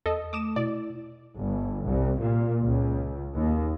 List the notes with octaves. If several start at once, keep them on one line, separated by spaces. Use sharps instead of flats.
E2 A4 D#5
A3 D6 D#6 E7
B2 E4 D5
G1
C2
A#2
C#2
D#2